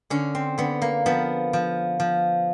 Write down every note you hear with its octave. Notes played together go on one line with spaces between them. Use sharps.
D3 C#4
C4
D3 B3
A#3
F3 B3
F3
F3